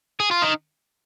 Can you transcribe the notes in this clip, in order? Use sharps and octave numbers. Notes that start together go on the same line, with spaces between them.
G#4
F4
D#3